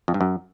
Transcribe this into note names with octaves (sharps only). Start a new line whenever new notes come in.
F2
G2
F#2